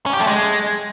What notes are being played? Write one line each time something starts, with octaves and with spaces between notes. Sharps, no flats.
C#4
G4
A3
G#3